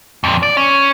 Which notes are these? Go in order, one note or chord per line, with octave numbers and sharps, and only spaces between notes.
F2 A#2
D5
C#4